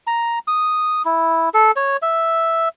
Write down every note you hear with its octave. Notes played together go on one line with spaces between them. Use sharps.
A#5
D#6
E4
A4
C#5
E5